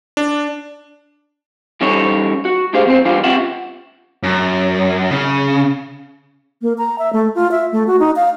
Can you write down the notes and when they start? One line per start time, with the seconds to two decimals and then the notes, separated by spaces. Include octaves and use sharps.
0.17 D4
1.81 E3 G3 C#4 D#4 A4 C#5
2.45 F#4
2.73 A3 D4 G4 G#4 C5 F5
2.86 E2 C4 C5
3.05 E3 G3 D4 F4 F5
3.24 C4 C#4 F4 G4 E5 F#5
4.23 F#2
5.11 C#3
6.62 A#3
6.78 A#5
6.99 E5
7.13 A3
7.35 F4
7.51 E5
7.72 A3
7.87 F#4
8.00 D#4
8.16 F5